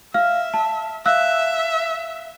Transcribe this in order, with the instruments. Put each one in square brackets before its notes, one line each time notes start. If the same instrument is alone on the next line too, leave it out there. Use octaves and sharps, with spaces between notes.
[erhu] E5 [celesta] F5 F6
[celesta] A5
[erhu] E5 [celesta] F5 E6 F#6